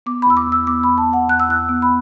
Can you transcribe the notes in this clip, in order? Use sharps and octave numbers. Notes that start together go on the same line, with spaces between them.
B3 D6
B5
E2 E6
D6
E2 E6
B3 D6
B5
E2
A5
E2 F#5
E2 F#6
E6
E2 F#6
B3
B5